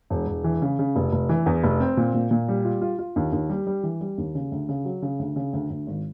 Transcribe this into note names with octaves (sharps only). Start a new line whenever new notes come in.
E1
E1
E3
C#3
C#3
F1
F1
E3
E2
F1
C4
A#2
A#2
A#2
G3
F4
F4
F4
D#2
D#2
G3
G3
E3
G3
D#2
C#3
D2
C#3
F#3
C#3
D2
C#3
D2
D2
G#1